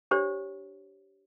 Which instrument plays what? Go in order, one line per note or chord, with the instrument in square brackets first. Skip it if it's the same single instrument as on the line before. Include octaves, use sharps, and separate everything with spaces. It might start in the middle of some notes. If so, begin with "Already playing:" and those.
[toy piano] D4 G4 C5 C#5